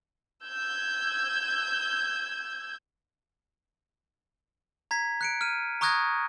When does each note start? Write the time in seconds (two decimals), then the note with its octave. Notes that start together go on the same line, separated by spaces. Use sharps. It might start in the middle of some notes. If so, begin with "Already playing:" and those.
0.45 E6 G6 G#6
4.91 A#5 G#6 B6
5.21 F#6 C#7 D7
5.41 F6 D#7
5.81 A#5 C#6 D#6 F#6 G#6 A#6